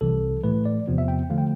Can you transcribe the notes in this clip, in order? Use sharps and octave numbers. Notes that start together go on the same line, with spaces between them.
C2 C3 E3 A4
A2 E3 A3 B4
D5
E2 C3 F3 B3
E5
G5
D3 F3 A3 F5
G5